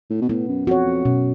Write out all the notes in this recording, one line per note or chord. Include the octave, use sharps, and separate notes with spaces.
A2
B2
A2 B3
F#2
F2 F#4 C#5
F2
F#2 B2